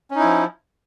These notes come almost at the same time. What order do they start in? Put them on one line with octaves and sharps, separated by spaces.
C#4 D#4 E4 F3